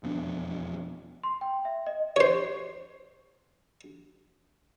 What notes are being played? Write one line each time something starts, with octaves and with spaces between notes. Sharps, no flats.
E1 F2 B3 D4
C6
G5
E5
D#5
C5 C#5